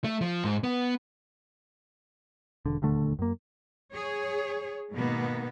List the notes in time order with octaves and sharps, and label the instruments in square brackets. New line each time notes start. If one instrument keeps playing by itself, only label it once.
[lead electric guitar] A3
F3
G#2
B3
[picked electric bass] E1 D3
D#1 D2 D3 A3
F#2 A#3
[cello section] G#4 C#5
G#2 B2 D#3 A#3 B3